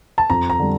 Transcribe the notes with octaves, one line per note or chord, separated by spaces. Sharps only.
A5
F2 A#5
A#5
D3 G3